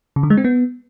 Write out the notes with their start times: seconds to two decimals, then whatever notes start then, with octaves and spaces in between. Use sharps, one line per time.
0.16 C#3
0.23 D3
0.30 G#3
0.37 C4
0.44 B3